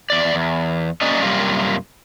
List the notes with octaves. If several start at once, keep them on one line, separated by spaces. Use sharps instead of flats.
E2 D5
E2
F#3 A#3 C#4 D5 D#5
F#2 C3 G3 A#3 F4